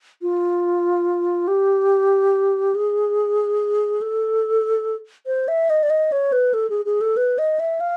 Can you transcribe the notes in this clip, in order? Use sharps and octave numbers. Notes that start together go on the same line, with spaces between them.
F4
G4
G#4
A4
C5
E5
D#5
D5
D#5
C#5
B4
A4
G#4
G#4
A4
B4
D#5
E5
F5